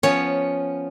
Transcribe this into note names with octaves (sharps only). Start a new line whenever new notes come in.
F3 B3 C#4 C#5